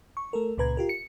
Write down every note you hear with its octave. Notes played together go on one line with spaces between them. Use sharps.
C#6
A3 A4 A#4
C#2 A#2 C#3 B4 A#5 G#6
F4 G4 A#4
C#7